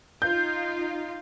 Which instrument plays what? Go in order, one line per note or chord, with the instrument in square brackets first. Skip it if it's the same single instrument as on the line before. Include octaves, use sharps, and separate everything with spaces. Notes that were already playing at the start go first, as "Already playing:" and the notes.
[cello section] D#4 F4 [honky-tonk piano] G6